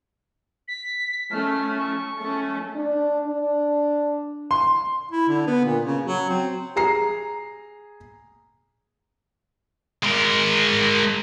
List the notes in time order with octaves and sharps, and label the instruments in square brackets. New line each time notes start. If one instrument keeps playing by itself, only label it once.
[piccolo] B6
[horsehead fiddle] A3 C#4 [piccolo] F6
[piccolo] C#6
[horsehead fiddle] A3 C#4
[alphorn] D4
D4
[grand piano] C6
[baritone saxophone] E4
D3
B3
A#2
C#3
F#3
C4
[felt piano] G#4 A#5 C7
[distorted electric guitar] G#3 A#4